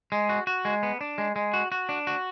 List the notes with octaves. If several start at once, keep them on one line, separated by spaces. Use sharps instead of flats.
G#3
F#4
F#4
G#3
B3
D4
G#3
G#3
F#4
F#4
D4
F#4